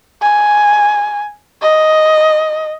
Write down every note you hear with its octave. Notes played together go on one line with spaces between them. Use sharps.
G#5
D#5